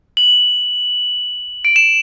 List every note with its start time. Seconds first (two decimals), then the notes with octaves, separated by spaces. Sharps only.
0.17 F#7
1.65 D7
1.76 E7